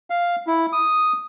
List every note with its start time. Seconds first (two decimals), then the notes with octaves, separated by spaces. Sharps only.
0.10 F5
0.47 E4
0.73 D#6